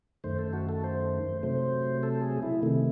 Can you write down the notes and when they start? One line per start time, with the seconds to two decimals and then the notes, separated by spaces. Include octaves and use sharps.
0.24 F#2 D#3 A3 C5
0.39 A4
0.53 F#4
0.69 A4
0.84 C5
1.43 C3 F#3 A3 C5
2.03 A4
2.22 G#4
2.43 E4
2.62 C3 D#3 A3